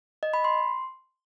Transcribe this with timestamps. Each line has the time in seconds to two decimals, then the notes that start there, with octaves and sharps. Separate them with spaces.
0.23 D#5
0.34 B5
0.44 C6